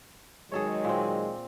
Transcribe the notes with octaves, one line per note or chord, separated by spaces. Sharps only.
D#3 F#3 G#3 G#4 A4 C#5
A#2 C4